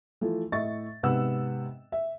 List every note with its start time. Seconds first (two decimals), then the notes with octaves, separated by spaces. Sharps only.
0.21 E3 F3 A3
0.52 A2 D#5 E5 C#6 A6
1.03 G#2 C3 B3 F#5 E6
1.92 E5